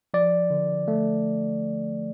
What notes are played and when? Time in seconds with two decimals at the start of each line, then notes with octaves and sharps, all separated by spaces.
0.14 F3 D5
0.50 D3
0.88 A3